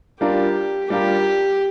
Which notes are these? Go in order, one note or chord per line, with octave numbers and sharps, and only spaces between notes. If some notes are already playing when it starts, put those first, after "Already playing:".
G3 D4 F4 G4 A#4
G3 D4 F4 G4 A#4